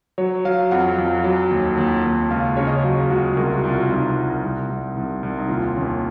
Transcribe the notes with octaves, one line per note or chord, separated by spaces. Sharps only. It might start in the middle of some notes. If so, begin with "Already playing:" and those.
F#3 C#5
F#3 F5
F2 F#5
F2
F#3
D#2
D#2
D#2
C#2 F5
C#3 C#5
D#5
C#5
F#3
C#2 F#4
G#4
C2 A#4
F#4
C2
F4
C2 D#4
C2
C2
C2
C2
C2
D#4
D#2 F4
D#2 C#4